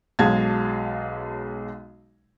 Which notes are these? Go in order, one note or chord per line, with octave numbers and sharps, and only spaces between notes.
B1 F#3 G#3 F5 A5 G#6